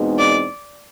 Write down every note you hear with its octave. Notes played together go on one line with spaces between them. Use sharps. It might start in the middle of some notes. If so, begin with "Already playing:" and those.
Already playing: E2 B2 G#3 C4 D#4
D5